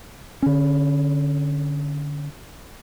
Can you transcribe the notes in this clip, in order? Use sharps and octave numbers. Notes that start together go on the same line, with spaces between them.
D3 C#4